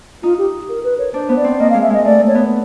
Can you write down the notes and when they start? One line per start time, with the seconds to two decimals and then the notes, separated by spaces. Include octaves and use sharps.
0.23 D#4 F4
0.38 G4
0.69 A#4
0.84 B4
0.99 C#5
1.14 D4 C5
1.29 B3
1.37 D5
1.44 C4
1.59 A#3 D#5
1.70 F5
1.74 G#3
1.82 E5
1.90 G#3 D#5
2.05 A3 D5
2.20 A3
2.28 C#5
2.35 B3